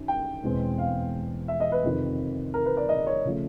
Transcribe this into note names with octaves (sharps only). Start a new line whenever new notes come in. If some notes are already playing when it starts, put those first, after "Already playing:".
Already playing: F#2 D#3
G5
E1 E2 B2 G#3 C4
F5
E5
D#5
B4
F2 C3 D#3
A#4
B4
D5
D#5
C#5
C#3 F3 A3